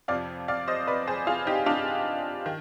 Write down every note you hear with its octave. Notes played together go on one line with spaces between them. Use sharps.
F2 C3 F3 D5 F5
D5 F5
C5 D#5
B4 D5
G#4 C5
F4 G#4
D#4 G4
D4 F4
D#3